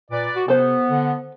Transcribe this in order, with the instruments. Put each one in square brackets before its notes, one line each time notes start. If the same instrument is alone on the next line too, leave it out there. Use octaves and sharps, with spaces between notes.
[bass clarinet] A#2 [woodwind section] B4 D5
[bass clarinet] F#4
[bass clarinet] C3 [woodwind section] B3 [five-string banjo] A4 C5
[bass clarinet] D3